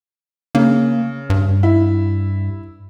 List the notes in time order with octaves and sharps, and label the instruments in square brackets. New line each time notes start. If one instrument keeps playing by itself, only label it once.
[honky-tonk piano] C#3 [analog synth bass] A#3
[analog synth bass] G2
[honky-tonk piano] E4